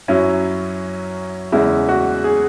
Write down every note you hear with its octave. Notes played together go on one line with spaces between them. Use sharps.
F#2 F#3 C#4 E4
E2 C#3 G#3 E4
F#4
G#4